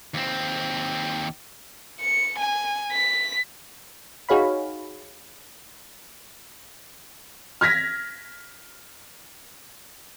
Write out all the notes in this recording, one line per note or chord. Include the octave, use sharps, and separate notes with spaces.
D#2 C4
C#7
G#5
B6
D#4 F#4 G#4 C#5 F5 B5
F6 G#6 A#6 B6